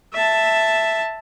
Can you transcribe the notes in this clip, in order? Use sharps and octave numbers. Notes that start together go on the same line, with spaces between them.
E5 A5